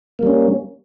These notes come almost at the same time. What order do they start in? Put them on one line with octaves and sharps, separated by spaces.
A#3 G3 C#4